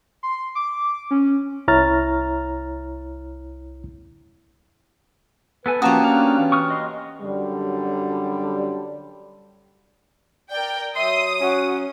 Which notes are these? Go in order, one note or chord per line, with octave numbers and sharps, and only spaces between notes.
C6
D6
C#4
C2 E4 C#5 A#5 F6 A6
B3 A4 B4 G#5
F3 A#3 C#4 F#4 G4 A5 D#6
B3 D4 F5
E3
C#6 D#6 F6
D#5 C6
F#2 D3 F#3 G3
A#4 D5 G5
F#3 E5 C6 D#6
C#4 F#4